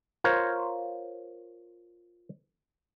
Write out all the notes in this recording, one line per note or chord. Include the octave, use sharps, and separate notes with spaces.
F4 A#4 C5 C#5